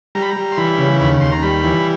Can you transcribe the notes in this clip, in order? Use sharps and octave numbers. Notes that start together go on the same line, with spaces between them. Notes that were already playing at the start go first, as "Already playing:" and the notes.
G3 A#5
B5
A#5
G3
C6
E3 B5
C#3
D#2 B5
D#2 C6
A#5
G3 B5
E3